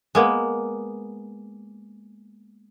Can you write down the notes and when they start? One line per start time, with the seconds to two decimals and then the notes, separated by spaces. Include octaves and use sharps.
0.15 G#3 A#3 B3